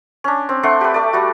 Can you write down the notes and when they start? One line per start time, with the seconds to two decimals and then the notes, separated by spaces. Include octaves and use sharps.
0.24 C#4 D4
0.49 C4
0.63 A3 D4 F#5 C6
0.81 G4 B4
0.94 A3 D5
1.13 G3 F#4